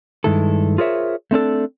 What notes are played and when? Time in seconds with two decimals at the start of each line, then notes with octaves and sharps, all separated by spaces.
0.24 G2 D#3 G#3 E4 A4
0.78 F4 G#4 A#4 C5 C#5 E5
1.31 A3 C4 D4 A4